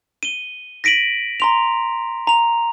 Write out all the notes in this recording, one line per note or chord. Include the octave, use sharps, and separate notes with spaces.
D#7 G7
A#6 B6 D7 D#7 F#7
A#5 C6 F7
A#5 F7